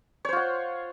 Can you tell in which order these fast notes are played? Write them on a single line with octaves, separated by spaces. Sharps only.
C#5 C5 F4 F#5